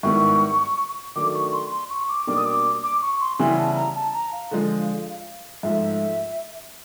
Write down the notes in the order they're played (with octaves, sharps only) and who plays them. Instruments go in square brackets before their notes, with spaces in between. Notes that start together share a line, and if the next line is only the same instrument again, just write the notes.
[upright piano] G#2 D#3 G3 B3 E4 [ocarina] C#6
[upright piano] D#3 F#3 A3 D4 [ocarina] D6
[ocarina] C#6
C6
C6
C#6
D6
[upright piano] B2 G3 A#3 D4 [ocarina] D6
[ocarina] D#6
D6
D6
C#6
C6
[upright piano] C#3 E3 G3 B3 E4 [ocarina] G#5
[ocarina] A5
A#5
A5
A#5
F5
[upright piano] D3 F3 G#3
[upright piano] G#2 F3 A3 [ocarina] E5